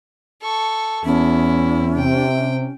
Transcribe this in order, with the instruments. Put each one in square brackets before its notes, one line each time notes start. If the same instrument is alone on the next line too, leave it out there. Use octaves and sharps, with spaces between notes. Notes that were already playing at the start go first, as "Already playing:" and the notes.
[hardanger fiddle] A4 C#6
[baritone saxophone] E2 [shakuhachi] C#4 [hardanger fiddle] E4
[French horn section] C3 [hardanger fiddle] G5